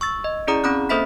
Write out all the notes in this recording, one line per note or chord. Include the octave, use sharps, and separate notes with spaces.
C#6 E6 A6
D#5
C#4 E4 G#4 D5 A#5 D#6
C4 C#4 B5 D#6 F#6
A#3 A4 C5 E5 B5 B6